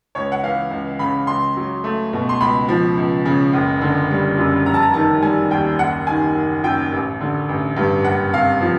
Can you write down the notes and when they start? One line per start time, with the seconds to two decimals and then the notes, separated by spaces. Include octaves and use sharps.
0.15 C#2 C#5
0.32 F#5
0.43 E3 F5
0.71 C#2
0.99 C#3 B5
1.27 C#2 C6
1.57 F#3
1.84 A3
2.13 B2
2.29 C6
2.40 C#2 B5
2.69 F3
2.97 C#2
3.25 C#3
3.53 F#1
3.81 D3
4.11 G3
4.38 F#2
4.66 F1 A#5
4.74 A5
4.82 A#5
4.94 D#3 A5
5.23 G3 G#5
5.51 D#2 G5
5.79 F#1 F#5
6.07 D#3 G#5
6.35 F#1
6.64 F#2 G5
6.92 A1
7.21 D3
7.49 A1
7.77 G2
8.04 F#1 F#5
8.33 C3 F5
8.61 F3